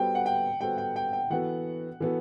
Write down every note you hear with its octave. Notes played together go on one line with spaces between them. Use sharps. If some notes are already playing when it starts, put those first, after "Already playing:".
Already playing: G3 B3 F#4 A4 C5 G5
F#5
G5
G3 B3 F#4 A4 C5 G5
G5
G5
G5
E3 B3 F#4 A4 F#5
E3 B3 F#4 A4